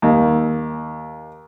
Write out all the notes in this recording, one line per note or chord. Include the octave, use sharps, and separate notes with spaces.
D#2